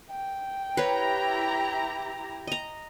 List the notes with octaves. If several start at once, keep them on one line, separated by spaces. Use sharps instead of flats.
G5
E4 G4 B4 C#5 A#5
D#5 A#5